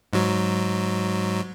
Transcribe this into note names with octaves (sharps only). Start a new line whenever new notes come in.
G#2 F#3